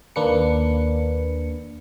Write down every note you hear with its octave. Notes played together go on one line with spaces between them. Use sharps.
D#2 A#3 D4 B4 C#7